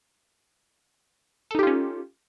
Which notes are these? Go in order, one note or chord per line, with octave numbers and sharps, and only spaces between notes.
C#4 D#4 F4 G4 A4